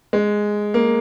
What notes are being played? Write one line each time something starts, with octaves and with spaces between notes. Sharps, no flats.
G#3
A#3